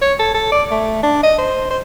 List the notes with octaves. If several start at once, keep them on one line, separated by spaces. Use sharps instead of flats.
C#5
A4
A4
D5
A3
D4
D#5
C5
C5